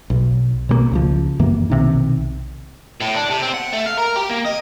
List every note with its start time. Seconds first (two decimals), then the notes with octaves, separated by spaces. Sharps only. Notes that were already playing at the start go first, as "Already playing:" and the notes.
0.10 B1
0.69 B2 G#3 A#3
0.91 C#2 C#3 F3
1.39 F#2 E3 A#3
1.70 B1 C3 D#3
3.00 A2
3.15 D4
3.30 C3
3.42 C4
3.54 F#5
3.73 A3
3.86 F5
3.97 A#4
4.16 G4
4.30 A#3
4.45 D#5